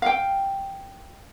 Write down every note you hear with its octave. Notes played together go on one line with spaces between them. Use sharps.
F5 G5